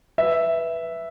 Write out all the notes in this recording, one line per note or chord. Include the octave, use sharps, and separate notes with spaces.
B4 E5